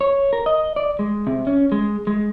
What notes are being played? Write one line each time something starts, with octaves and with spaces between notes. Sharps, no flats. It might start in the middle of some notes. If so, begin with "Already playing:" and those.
C#5
A#4
D#5
D5
G#3
C3
C#4
G#3
G#3